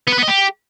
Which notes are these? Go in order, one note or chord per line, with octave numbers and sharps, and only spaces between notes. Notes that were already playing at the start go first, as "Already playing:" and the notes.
B3
B4
B3
D#5
G4